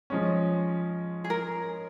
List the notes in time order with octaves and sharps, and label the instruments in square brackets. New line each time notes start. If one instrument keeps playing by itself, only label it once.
[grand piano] F3 G#3 C#4
[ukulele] G#4
A#4